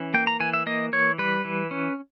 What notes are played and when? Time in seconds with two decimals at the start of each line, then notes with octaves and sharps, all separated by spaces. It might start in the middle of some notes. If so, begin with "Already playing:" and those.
Already playing: E3 C#4
0.14 A#3 G5
0.27 A#5
0.40 E3 G#5
0.54 E5
0.66 A#3 D#5
0.93 E3 C#5
1.18 G3 B4
1.45 E3
1.71 C#4